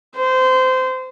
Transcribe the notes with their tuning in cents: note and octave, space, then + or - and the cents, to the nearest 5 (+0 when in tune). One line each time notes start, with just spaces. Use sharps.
C5 -20